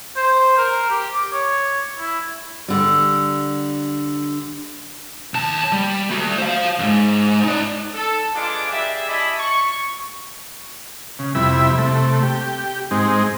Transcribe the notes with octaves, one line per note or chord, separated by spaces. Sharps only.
C5
A#4
G4
D6
C#5
E4
D3 G3
D#2 A5
G3
A3 F#4
C5 F5
F2 G#2
D#4 D5
A4
G#3 D4 F4 B4 D5 D6
G3 G#4 D5 E5
E4 D5 D#5 G#5 A5 B5
C#6
C#3
F2 C3 G3 E4 E5 B5
C3 A3
G4
G#2 G#3 C4 D#4